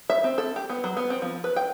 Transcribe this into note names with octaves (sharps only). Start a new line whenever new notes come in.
E5
C4
A4
G4
B3
F#3
B3
C4
F3
B4
G5